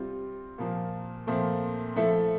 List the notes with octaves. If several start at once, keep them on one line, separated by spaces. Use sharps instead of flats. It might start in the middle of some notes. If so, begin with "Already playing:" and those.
Already playing: C3 G3 C4 F4
A#2 F3 A#3
A#2 F3 A3 C4
F3 A3 E4 A4